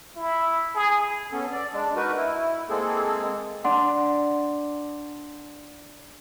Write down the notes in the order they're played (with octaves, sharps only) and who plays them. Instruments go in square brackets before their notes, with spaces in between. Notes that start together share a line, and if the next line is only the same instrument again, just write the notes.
[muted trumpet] E4
G#4
[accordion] B3 C#4 A4
D5
G#3 D4
D#4 F#4 A#4 B4
E4
G#3 A#3 C4 G#4 A4
[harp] D4 [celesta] F#5 C6